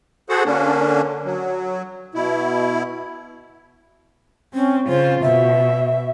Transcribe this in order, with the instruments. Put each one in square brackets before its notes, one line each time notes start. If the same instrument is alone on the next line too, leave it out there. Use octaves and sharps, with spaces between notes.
[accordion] F#4 G#4 A4 C5 F#5
D3 A#3 C#4 D4
F#3
B2 E4
[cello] C4 [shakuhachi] C#4
[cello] C#3 F4 [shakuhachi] C5
[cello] B2 [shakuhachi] E5